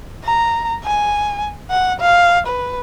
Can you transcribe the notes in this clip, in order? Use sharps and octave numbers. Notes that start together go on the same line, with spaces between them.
A#5
G#5
F#5
F5
B4